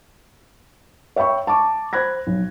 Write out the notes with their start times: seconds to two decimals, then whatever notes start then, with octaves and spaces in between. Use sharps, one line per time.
1.16 C#5 E5 G5 B5 C#6
1.47 A5 C#6 D6
1.93 C5 B5 F#6 G#6 A#6
2.27 B1